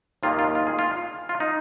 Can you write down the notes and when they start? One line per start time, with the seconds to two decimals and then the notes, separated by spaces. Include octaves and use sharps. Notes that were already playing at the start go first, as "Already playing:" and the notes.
0.23 D#2 D#3 A#3 F4
0.39 F4
0.55 F4
0.67 G#4
0.79 F4
1.29 F4
1.40 D#4